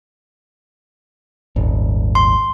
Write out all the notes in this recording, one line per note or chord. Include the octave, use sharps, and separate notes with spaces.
D#1 G#1
C6